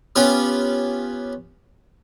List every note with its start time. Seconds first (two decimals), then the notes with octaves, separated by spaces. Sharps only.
0.16 B3 C#4 F4 G4 B4 C#5